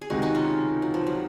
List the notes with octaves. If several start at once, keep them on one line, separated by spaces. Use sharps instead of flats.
G#4
C#2 C3 D#3 G#3 D#4 F#4
D#4 F#4
C#4 F4
F#3
F3
F#3